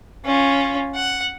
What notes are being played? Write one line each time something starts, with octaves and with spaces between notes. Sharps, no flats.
C#4 F4
F#5